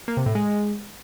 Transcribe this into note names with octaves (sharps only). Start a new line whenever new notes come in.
A#3
C3
A2
G#3